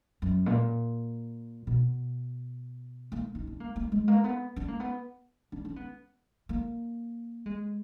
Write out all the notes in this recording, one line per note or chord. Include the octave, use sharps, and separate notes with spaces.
F#2
A#2
B2
A#3
D#4
D4
A#3
A#3
G#3
A#3
B3
D4
A#3
B3
D4
D4
B3
A#3
G#3